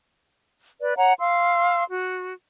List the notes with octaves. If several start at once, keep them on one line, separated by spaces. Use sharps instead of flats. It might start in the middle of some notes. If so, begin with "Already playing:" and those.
B4 D5
C#5 F#5 A#5
F5 C6 E6
F#4